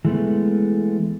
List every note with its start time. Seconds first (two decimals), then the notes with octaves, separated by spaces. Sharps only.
0.05 E3 G#3 A3 B3